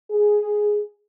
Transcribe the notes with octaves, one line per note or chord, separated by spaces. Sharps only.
G#4